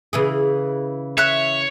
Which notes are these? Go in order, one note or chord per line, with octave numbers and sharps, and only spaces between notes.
C#3 E3 G#4
C#5 E5 F#6